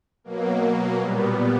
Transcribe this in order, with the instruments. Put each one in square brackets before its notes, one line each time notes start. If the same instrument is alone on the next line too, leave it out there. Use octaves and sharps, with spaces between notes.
[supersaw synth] B2 F#3 A#3
A#2 G3 B3